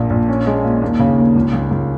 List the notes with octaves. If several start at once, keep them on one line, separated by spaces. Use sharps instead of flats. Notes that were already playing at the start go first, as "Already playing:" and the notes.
Already playing: A#1 A#2
A#1
C#4
G#3
A#2
D#2
C#3
D#2
C#2
C#2
C#2